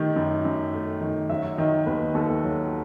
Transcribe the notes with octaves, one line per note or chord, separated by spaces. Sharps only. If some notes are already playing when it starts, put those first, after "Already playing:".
Already playing: D#3 A3 G4
F#2
F#2
A3
D#3
F#3 E5
D#3 D#5
D#2 B4
D#2 A4
F#3